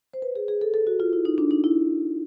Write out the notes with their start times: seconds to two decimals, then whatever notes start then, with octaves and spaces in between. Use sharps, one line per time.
0.14 C5
0.22 B4
0.36 G#4
0.48 G#4
0.61 A4
0.74 A4
0.87 F#4
1.00 F4
1.13 E4
1.25 D#4
1.38 D4
1.51 D#4
1.64 E4